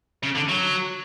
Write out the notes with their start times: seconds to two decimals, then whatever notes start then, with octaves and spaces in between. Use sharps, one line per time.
0.23 C#3
0.35 D3
0.49 F#3